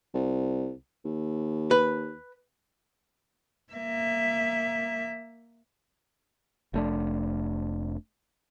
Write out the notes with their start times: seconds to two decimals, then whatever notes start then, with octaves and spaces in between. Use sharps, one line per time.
0.14 C2
1.04 D#2
1.71 B4
3.73 A#3 E5
6.74 F1 A3 D4